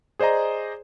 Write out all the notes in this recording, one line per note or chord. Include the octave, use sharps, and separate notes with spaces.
G#4 C5 D5 D#5 A#5